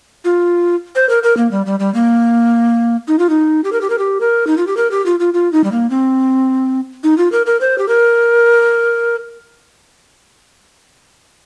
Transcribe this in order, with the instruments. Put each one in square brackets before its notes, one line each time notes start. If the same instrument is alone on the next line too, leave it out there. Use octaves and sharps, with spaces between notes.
[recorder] F4
C5
A#4
A#4
A#3
G3
G3
G3
A#3
D#4
F4
D#4
G4
A#4
G4
A#4
G4
A#4
D#4
F4
G4
A#4
G4
F4
F4
F4
D#4
G3
A#3
C4
D#4
F4
A#4
A#4
C5
G4
A#4